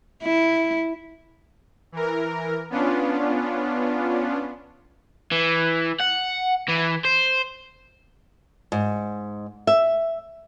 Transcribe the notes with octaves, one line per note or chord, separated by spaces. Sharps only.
E4
E3 A#4
B3 C#4 D4 F4
E3
F#5
E3
C5
G#2
E5